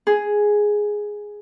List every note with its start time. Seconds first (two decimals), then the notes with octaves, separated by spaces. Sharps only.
0.07 G#4